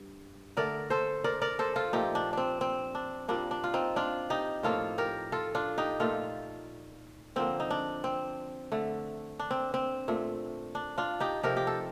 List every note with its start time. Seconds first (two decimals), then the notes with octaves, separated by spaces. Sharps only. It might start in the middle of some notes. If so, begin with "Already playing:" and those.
Already playing: G2
0.57 D3 A3 A#4 D5
0.90 A4 C5
1.24 A#4 D5
1.42 A#4 D5
1.59 A4 C5
1.76 F4 A4
1.93 A#2 F3 A3 D#4 G4
2.15 D4
2.33 C4 D4
2.61 C4
2.95 D4
3.28 A#2 G3 A#3 D4
3.51 D4
3.64 F4
3.74 C4 D#4
3.96 D4 F4
4.30 D#4 G4
4.63 A2 F3 A#3 F4 A4
4.98 G4 A#4
5.32 F4 A4
5.55 D4 F4
5.78 D#4 G4
6.00 A#2 A3 F4 A4
7.36 D3 F3 A#3 C4
7.60 D#4
7.70 D4
8.04 C4
8.72 D3 A3
9.39 D4
9.51 C4
9.74 C4
10.08 A#2 A3
10.75 D4
10.98 D4 F4
11.20 D#4 G4
11.43 C3 F3 A3 G4 A#4
11.57 G4
11.67 A4